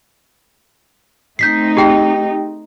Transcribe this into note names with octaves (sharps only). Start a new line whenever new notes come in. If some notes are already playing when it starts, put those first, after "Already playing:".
A3 C4 D#4 G6 B6 C7
G4 G#4 G5